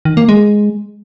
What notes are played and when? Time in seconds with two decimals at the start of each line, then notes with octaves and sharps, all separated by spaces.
0.05 D#3
0.17 A#3
0.29 G#3